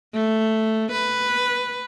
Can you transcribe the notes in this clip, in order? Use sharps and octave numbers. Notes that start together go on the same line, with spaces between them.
A3
B4